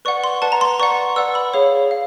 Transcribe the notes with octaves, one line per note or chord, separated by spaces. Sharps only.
B4 D5 F#5 C#6
C6
B4 D5 F#5 A5
A#5
C6
B4 D5 F#5 C#6
B4 D5 F#5 E6
B5
G#4 C#5 F5
F5